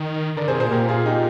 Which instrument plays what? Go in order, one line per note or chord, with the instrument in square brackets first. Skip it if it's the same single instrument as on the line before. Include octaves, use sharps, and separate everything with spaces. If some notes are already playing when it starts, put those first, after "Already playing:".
Already playing: [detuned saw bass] D#3
[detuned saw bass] D3 [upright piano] A#4 D5
[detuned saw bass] C3 [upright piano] G#4 C5
[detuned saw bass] A#2 [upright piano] G#4 C5
[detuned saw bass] A#2 [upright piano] G4 A#4
[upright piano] F4 G#4
D#4 G4